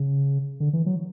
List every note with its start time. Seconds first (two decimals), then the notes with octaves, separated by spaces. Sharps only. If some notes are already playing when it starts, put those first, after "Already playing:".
Already playing: C#3
0.60 D3
0.73 E3
0.86 F#3